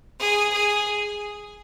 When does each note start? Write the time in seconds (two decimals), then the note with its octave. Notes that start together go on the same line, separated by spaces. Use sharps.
0.20 G#4
0.53 G#4